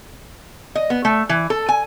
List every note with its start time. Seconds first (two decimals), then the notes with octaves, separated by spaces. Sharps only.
0.75 D#5
0.90 B3
1.05 A3
1.29 E3
1.50 A4
1.69 G#5